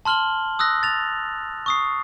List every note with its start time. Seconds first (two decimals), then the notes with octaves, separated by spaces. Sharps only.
0.05 A5 C6 F6 F#7 G7
0.59 D#6 E6 F#6 A#6
0.83 A6 F7
1.66 C#6 D#6 C7